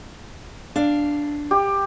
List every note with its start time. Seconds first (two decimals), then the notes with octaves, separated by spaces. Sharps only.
0.76 D4 F5
1.51 G4